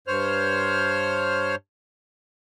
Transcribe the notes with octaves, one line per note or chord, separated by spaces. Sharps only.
G2 C5 C#5 F6